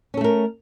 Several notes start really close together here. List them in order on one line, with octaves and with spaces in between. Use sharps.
C#4 A4 A3 A#4